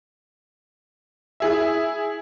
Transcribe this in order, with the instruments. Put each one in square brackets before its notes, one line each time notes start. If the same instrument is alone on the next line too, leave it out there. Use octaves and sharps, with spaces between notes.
[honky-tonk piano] E4 G#4 E5